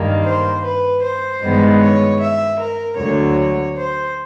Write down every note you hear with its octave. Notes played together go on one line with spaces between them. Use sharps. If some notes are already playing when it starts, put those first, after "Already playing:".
Already playing: G2 D#3 G3 A#3
C5
B4
C5
G2 D#3 G#3 B3
C#5
E5
A#4
D2 D3 F#3 C#5
C5